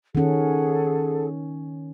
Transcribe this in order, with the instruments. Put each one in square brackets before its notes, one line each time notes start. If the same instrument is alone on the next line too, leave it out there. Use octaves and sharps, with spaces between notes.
[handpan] D#3 C#4 [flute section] G#4 A4 F#5